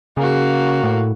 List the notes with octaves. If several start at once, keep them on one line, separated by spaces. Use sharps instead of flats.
C#3 A#3 F#4
A2